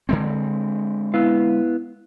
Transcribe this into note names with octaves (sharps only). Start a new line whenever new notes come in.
D3 G#3 C4
B3 E4 F5